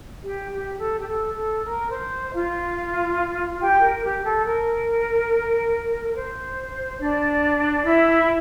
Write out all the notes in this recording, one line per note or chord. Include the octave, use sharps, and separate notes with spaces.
G4
G4
A4
G4
A4
A4
A#4
C5
F4 F5
G4 G5
A#4
G4
A4
A#4
A#4
C5
D4 D5
E4 E5